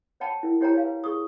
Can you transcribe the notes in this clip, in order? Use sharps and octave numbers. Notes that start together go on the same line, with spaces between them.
C#5 F#5 G5 A5 B5
E4 A#4
E4 G4 C#5 G5 G#5 A#5
C#5 F5
B4
G#4 C#6 D#6